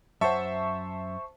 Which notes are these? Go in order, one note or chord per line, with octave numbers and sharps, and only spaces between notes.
F#2 C5 C#5 E5 F#5 A5 C#6